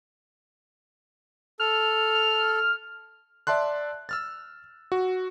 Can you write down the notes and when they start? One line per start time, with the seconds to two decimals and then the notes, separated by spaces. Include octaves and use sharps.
1.60 A4 F6
2.15 F6
3.47 D5 E5 A5 C6 F#6
4.09 E6 F6 A6
4.92 F#4